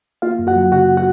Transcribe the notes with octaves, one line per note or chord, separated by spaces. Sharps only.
A#3 F4 F5
F#2
F#4 F#5
F#3
C#3 F#4 F#5
F#4 F#5